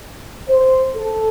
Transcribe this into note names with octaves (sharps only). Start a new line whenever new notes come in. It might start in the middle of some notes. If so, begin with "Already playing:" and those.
C5
A4